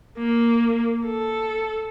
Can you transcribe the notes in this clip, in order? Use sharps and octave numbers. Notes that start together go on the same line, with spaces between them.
A#3
A4